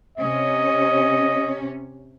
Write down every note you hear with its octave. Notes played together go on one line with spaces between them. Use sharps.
C3 C#4 D#5